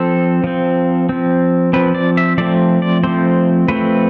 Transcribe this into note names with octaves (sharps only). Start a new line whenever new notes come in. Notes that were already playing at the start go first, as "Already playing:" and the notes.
Already playing: F3 C4 A4
F3 C4
F3 C4
F3 C4 B4
D5
E5
F3 A3 C4 D5
D5
F3 A3 C4 C5
F3 A3 C4 B4